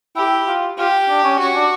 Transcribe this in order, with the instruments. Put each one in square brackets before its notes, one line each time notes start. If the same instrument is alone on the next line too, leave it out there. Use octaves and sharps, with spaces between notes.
[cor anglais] E4 [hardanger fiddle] G4
[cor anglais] F4
[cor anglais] F4 [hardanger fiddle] G4
[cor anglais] D4
C#4
[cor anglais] C#4 [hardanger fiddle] F#4
[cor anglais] D4